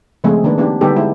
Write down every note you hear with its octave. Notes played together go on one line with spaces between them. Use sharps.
C#3 F3 G#3 A3 C4 G#4
D#3 A#3 D4 B4
B3 C4 D4 D#4 G4
D3 G3 B3 D#4 G4 A4
G#3 E4 C5